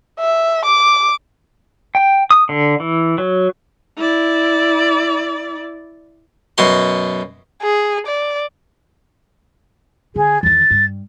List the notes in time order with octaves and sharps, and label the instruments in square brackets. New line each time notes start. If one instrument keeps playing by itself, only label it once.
[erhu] E5
D6
[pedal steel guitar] G5
D#6
D3
E3
F#3
[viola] E4 D5
[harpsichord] F#2 B2 C6
[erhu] G#4
D5
[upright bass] D3 [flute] G#4
[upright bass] E2 D#3 [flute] A6
[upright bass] G2